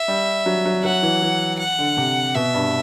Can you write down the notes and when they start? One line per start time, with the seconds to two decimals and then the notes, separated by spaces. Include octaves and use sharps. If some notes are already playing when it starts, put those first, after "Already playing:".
Already playing: E5
0.08 G3
0.46 F#3
0.65 F#3
0.84 F#3 F#5
1.03 E3
1.22 E3
1.59 F#5
1.79 D3
1.97 C3
2.35 B2 E5
2.54 G2